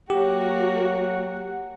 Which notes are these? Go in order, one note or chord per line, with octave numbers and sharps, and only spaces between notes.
F#3 A#3 F#4 G4 F#5